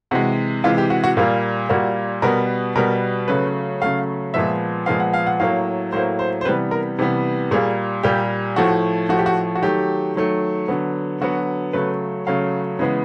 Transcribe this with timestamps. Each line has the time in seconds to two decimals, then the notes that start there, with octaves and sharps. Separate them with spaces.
0.11 C3 E3 G#3 F#4
0.64 C3 E3 G#3 F4
0.78 G4
0.90 F#4
1.04 F#4
1.17 A#2 G3 A#3 F4
1.69 A#2 G3 A#3 F#4
2.22 B2 G3 B3 A#4
2.76 B2 G3 B3 A#4
3.28 C#3 F#3 A3 B4
3.81 C#3 F#3 A3 F5
4.34 A#2 F3 G#3 B3 E5
4.86 A#2 F3 G#3 B3 F5
5.00 F#5
5.14 F5
5.27 F#5
5.39 A2 F#3 A#3 F5
5.92 A2 F#3 A#3 C5
6.19 C5
6.41 C5
6.45 C3 E3 G3 B3 B4
6.71 A#4
6.99 C3 E3 G3 B3
7.51 A#2 G3 A#3 G#4
8.03 A#2 G3 A#3 G4
8.56 A2 F3 A3 F#4
9.09 A2 F3 A3 F#4
9.19 G4
9.26 F#4
9.55 F#4
9.62 D#3 F#3 A3 G4
10.16 D#3 F#3 A3
10.68 D3 F#3 B3
11.21 D3 F#3 B3 F#4
11.73 C#3 F#3 A3 B4
12.27 C#3 F#3 A3 F5
12.79 C#3 E3 G#3 B3